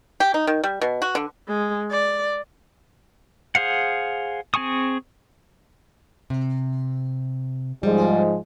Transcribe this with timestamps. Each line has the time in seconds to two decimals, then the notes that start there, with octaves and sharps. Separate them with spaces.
0.20 G4
0.34 D#4
0.47 D#3
0.64 G3
0.81 B2
1.02 F#4
1.15 D3
1.48 G#3
1.91 D5
3.55 G#4 C5 F5 F#5
4.54 C4 G#4 G#5 C#6 D#6
6.30 C3
7.83 G#2 F3 G3 G#3